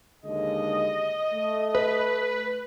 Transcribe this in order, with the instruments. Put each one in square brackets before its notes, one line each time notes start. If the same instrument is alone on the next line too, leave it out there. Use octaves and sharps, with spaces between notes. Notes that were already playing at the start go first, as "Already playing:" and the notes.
[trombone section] D#2 D3 G#3 [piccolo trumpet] D#5
[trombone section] A3
[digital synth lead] B4